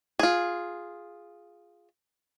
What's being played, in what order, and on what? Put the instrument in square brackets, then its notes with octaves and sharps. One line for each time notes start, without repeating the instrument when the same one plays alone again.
[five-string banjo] F4 G#4